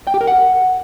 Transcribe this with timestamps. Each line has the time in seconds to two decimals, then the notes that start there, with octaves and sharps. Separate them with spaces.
0.07 G5
0.14 G4
0.21 A#4
0.27 F#5